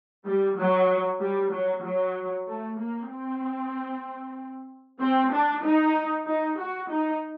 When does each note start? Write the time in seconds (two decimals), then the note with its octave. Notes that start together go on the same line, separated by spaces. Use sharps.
0.25 G3
0.57 F#3
1.20 G3
1.51 F#3
1.83 F#3
2.47 A3
2.78 A#3
3.10 C4
5.00 C4
5.32 D4
5.63 D#4
6.26 D#4
6.58 F#4
6.89 D#4